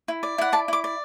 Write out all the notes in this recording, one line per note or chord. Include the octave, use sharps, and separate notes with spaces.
E4
D5
E4 F#5
D5 A5
E4 D6
D5